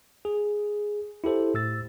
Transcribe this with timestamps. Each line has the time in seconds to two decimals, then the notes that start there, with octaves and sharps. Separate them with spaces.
0.25 G#4
1.24 E4 G4 A4 C5
1.54 A2 E6 A6